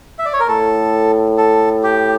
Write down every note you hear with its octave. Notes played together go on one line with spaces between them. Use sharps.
E5
D5
C#5
A#4
A2 A4
A4
G4